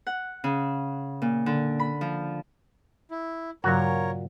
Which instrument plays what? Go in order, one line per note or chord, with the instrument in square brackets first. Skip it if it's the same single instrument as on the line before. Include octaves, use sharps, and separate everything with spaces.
[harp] F#5
C#3
A#2
D3
B5
F3
[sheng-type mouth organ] E4
[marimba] G2 C#3 F#3 [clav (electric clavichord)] A#2 F#4 [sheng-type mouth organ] A#4 C#5